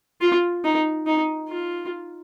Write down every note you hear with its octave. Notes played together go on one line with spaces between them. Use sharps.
F4
D#4
D#4
F4